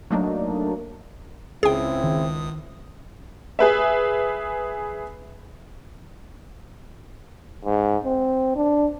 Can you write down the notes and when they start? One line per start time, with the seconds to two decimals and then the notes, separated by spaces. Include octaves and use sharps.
0.10 F#3 A3 A#3 D4 D#4
1.63 C#2 C#3 C4 E4 G#4 G5 D#6
2.03 D#3
3.59 G#4 B4 E5
7.65 G#2
8.04 C4
8.56 D4